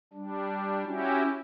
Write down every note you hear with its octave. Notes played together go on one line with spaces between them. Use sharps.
G3 D4
C#4 E4 F#4 G4